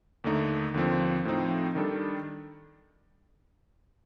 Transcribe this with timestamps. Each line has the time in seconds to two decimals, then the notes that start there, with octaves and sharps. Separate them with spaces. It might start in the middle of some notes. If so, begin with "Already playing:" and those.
0.24 D#2 D3 A3 D#4
0.74 D#2 D3 F3 C4
1.25 A2 F3 C4 D#4
1.75 D#3 G3 D4 A4